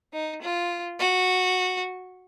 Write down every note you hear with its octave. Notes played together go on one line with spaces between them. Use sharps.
D#4
F4
F#4